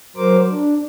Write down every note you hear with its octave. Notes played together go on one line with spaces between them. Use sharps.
F#3 A#4 C5 D6
D4